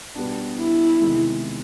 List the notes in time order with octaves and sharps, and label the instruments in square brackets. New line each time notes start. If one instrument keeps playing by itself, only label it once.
[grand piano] B2 G3 B3 D4
[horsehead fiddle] E4
[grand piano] E2 C3 D#3 G#3